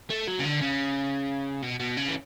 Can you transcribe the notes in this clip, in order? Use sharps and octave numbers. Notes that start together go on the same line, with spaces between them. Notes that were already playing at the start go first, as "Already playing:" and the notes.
A3
F#3
C#3
D3
C#3
B2
B2
C#3
E3